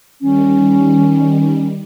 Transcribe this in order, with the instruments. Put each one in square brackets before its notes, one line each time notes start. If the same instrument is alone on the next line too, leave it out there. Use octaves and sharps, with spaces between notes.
[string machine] D#3 G3 [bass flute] C#4